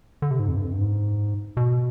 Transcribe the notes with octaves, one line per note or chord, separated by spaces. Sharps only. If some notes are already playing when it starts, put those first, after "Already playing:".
D3
C3
G#2
F2
G2
F2
G2
G#2
B2